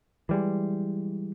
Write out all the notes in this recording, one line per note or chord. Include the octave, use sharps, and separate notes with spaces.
E3 G3 G#3